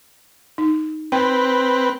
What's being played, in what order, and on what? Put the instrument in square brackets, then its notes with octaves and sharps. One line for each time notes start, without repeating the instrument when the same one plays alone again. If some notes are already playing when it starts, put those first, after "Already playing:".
[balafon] D#4
[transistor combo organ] C4 B4 [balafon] C5 G5